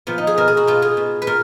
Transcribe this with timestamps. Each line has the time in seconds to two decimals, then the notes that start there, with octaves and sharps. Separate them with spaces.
0.07 A#2 F3 B3
0.18 D#4
0.27 G#4
0.38 B2 A#4
0.48 G#4
0.57 F#4
0.67 B2 F4
0.82 G#4
0.97 B2
1.22 B4
1.27 A#2 A#4